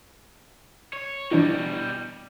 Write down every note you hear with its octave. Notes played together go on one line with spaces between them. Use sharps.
C#5
B2 E3 G3 D4 E4